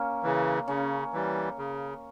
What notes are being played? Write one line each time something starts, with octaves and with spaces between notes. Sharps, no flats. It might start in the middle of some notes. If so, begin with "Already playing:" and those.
Already playing: A#3 C#4
C#3 E3
C#3 C#4
E3 G3
C#3